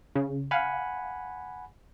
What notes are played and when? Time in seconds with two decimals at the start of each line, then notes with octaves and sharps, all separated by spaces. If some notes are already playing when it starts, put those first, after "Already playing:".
0.16 C#3
0.51 F5 F#5 G#5 B5